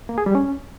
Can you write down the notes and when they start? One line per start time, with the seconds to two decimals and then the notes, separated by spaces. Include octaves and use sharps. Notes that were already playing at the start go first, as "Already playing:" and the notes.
0.09 A#3
0.18 G#4
0.26 G3
0.35 C#4